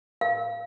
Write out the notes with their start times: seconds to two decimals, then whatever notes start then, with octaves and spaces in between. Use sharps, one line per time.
0.21 F5